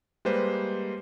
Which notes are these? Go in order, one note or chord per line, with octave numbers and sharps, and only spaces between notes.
G3 G#3 A#3 B4 C5